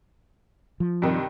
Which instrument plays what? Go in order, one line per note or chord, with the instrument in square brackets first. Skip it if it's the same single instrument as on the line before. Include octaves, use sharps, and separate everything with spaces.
[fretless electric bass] F3
[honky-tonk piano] G2 C3 D#3